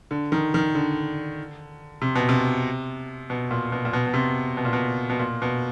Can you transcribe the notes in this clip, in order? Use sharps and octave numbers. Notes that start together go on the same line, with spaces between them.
D3
D#3
D#3
D3
C3
B2
C3
B2
A#2
B2
A#2
B2
B2
C3
B2
A#2
B2
B2
A#2
B2